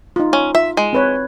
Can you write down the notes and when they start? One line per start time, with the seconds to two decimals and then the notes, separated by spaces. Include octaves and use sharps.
0.16 D#4 F4
0.33 C#4
0.55 F4 E5
0.77 G#3
0.93 C4 B4 C#5